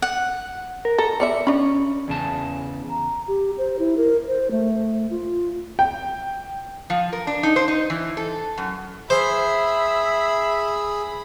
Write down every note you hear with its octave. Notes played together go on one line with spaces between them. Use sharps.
F#5
A#4
A4 A#5
B3 D5 E5 C#7
C#4 D4 B5
E2 C#3 A5
A#5
G4
C5
E4
A#4
C5
A3
F4
G5
F3
A#4
D4
D#4
C5
D#4
E3
A4
F#2
G#4 C5 E5 B5